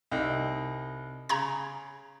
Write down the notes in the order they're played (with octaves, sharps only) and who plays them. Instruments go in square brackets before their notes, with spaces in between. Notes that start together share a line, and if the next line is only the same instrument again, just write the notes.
[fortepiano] C2 D#4
[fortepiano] C#3 [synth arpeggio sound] A#5 B5 G#6